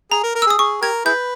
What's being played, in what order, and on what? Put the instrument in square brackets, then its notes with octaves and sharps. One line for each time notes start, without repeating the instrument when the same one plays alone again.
[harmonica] G#4 [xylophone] A#5
[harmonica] A#4
A#4
[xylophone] E6
[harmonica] G#4
[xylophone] D#6
[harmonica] G#4 [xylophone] C#6
[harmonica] G4 A#4 [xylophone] G#6
[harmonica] E4 G#4 B4 [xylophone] G6